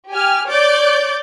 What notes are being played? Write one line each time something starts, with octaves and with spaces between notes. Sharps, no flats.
G4 G#5 F6
C#5 D5 D6 G6 A6